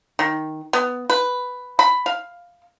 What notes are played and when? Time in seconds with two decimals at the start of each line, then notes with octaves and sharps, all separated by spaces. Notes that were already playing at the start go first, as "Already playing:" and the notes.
0.19 D#3
0.73 B3
1.10 B4
1.79 B5
2.06 F5